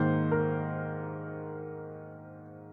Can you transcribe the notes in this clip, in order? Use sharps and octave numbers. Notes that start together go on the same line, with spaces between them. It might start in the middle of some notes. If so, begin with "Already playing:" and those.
Already playing: G#2 D#3 A#3 C5
A#4